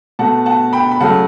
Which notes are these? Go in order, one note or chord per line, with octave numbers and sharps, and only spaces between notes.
B2 A3 F#5 A5
F#5 A5
G5 B5
B5
C#3 F#3 A3 F#5 A5